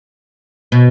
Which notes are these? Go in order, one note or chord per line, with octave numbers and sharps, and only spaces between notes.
B2